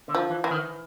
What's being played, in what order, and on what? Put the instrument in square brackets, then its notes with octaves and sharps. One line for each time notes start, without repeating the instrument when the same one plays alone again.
[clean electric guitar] D3
[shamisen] F3
[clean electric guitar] E3
[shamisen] E3
[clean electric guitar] D#3